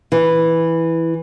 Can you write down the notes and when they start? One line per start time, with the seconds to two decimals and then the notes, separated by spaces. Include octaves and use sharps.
0.12 E3